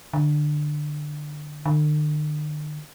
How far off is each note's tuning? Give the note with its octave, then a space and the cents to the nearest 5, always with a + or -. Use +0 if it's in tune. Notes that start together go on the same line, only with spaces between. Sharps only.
D3 +20
D3 +45